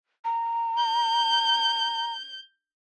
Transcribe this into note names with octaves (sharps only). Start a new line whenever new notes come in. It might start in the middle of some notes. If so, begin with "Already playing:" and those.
A#5
G6